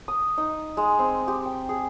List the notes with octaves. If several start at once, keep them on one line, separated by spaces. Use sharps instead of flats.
D#6
D#4
G#3
C4
G4
G5
G#4